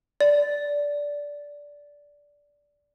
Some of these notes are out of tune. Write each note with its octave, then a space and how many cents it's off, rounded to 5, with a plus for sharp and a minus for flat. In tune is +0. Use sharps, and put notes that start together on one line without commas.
D5 -15